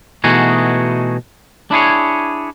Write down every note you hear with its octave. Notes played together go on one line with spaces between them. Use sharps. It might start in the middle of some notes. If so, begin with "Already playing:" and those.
B2 E3 A3 D#4 F#4 G#4
D4 E4 G#4 C#5